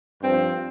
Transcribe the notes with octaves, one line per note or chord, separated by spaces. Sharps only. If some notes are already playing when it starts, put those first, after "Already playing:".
G2 F3 C4